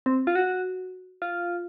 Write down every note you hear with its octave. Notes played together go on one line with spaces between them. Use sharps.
C4
F4
F#4
F4